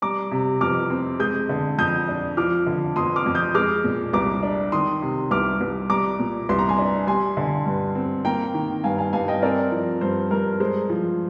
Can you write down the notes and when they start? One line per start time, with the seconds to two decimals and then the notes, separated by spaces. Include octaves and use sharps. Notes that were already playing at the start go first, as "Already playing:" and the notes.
0.02 G3 A#5 D6
0.31 C3
0.61 F2 D6 F6
0.90 C4
1.20 G#3 D#6 G6
1.49 D3
1.78 F2 D#6 G6
2.08 D4
2.37 F3 D6 F6
2.66 D3
2.96 F2 C6 D#6
3.16 D6 F6
3.26 F2
3.35 D#6 G6
3.55 G#3 D6 F6
3.84 A#2
4.13 C2 A#5 D6
4.43 D4
4.72 D#3 C6 D#6
5.02 C3
5.31 C2 D6 F6
5.61 C2
5.90 G3 A#5 D6
6.19 A#2
6.49 C2 C6
6.59 A#5
6.69 G#5 C6
6.78 D4
7.07 G3 G#5 C6
7.37 D3
7.66 G2
7.95 C4
8.25 A#3 G5 A#5
8.54 D#3
8.84 G2 F5 G#5
8.98 F5 G#5
9.13 G2 F5 G#5
9.28 D#5 G5
9.42 C4 A#4 D5
9.72 F3
10.01 G2 C5
10.31 G2 A#4
10.60 G#3 C5
10.90 F3